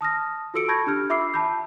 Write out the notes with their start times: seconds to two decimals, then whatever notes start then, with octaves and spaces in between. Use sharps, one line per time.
0.01 A5 D#6 F6 A#6
0.54 F4 F#4 A4 E6 C#7 D7
0.68 A5 B5 C#6 G6 G#6 A#6
0.87 D4 G4 F6 G6
1.09 F4 E5 B5 D6 E6 C7
1.34 A5 B5 G6